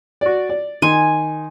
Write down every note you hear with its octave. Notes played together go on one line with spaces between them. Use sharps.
F#4 D5
D5
D#3 G#5 C6